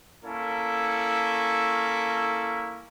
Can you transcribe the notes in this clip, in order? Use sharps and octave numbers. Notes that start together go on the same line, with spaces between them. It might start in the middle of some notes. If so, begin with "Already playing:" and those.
A#3 C#4 E4 A4